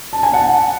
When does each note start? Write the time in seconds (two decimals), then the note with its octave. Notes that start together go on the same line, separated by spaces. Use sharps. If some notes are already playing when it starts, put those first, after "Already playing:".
0.13 A5
0.23 G#5
0.33 F#5 A5